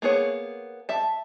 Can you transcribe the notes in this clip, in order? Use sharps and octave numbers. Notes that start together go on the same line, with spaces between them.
A#3 B3 G#4 C#5
E5 A5